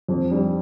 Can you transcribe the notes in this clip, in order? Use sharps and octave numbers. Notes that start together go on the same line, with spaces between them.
F2
G3